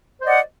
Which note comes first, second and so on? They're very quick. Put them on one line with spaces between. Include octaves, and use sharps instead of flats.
C5 D#5 D5 F#5